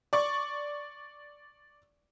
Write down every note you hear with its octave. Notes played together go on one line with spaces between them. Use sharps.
D5 C#6